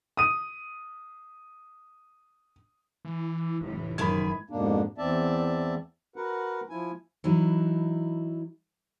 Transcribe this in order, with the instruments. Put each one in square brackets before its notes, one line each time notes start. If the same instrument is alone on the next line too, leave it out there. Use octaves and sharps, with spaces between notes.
[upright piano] D#6 D#7
[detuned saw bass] E3
[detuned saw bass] F1 [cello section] A2 E3
[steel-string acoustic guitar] F#2 D#3 G#4 [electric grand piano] B5 G#6
[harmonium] F2 G#2 B2 A#3 D4
E2 E3 C4 D5 E5 A5
F#4 A#4 B4 F#5
F3 E4 G#5
[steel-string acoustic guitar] E3 F#3 D#4 E4